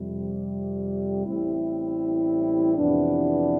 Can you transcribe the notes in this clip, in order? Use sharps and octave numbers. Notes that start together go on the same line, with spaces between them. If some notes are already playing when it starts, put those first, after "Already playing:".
Already playing: F2 C3 G3
A1 A2 G3 C4 E4
F2 C3 E3 B3 D4